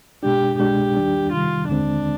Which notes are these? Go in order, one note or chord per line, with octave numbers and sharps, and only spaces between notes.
B2 G#3 D4 G4
C2 B2 G#3 D4 G4
D#2 D#3 G3 D4
C3 D#3 G3 F4
D#2 D3 G#3 C4 D4